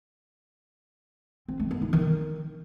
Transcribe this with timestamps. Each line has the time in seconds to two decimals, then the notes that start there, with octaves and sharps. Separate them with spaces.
1.48 C4
1.60 A3
1.71 B3
1.82 D#4
1.93 D#3